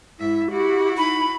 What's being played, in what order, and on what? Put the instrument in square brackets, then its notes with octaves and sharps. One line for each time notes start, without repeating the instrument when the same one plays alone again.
[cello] G#2 E5 [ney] E4
[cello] E4 F#4 [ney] G4
[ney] D#4 [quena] B5